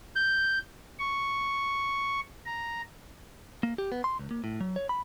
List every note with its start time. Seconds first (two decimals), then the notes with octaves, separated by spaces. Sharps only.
0.16 G6
0.99 C#6
2.46 A#5
3.63 A#3
3.78 G4
3.92 B3
4.04 C6
4.19 C#2
4.31 A#3
4.44 A2
4.61 F#3
4.76 C#5
4.89 B5